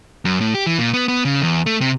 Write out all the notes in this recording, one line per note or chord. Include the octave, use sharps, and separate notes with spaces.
F#2
A2
G4
E3
A#2
B3
B3
C#3
E2
A3
C3